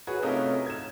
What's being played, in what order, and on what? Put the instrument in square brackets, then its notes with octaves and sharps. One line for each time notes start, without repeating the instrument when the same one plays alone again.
[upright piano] F#4 G#4 B4 C#5
C3 A3 C#4 D#4 F4 A#4
G#6 E7